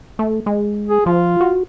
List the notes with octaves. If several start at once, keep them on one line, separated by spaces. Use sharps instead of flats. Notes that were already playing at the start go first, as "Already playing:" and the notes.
A3
G#3
G#4
F3 F4
F#4